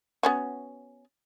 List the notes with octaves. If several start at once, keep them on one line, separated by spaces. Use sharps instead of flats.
B3 C#4 F#4